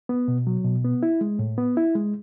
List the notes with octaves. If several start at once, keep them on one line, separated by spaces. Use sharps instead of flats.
B3
B2
F#3
B2
B3
E4
G#3
A2
B3
E4
G#3